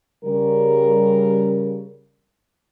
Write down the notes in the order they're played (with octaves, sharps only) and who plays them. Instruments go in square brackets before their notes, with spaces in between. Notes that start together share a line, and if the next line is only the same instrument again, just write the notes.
[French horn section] C#3 G3 A#4